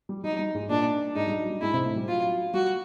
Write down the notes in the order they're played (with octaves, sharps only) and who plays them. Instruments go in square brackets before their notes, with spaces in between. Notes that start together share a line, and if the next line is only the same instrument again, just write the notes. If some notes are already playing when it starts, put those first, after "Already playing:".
[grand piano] G3
[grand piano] G3 [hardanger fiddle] D#4
[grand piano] G3
G#2 G#3
[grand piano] A#2 A#3 [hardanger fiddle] D4
[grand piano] G#2 G#3 [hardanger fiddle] D#4
[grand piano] G3
F#3
G3
[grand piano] G#2 G#3 [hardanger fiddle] E4
[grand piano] C3 C4
A2 A3
G3
[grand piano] F#3 [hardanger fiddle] F4
[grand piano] G3 [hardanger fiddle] F#4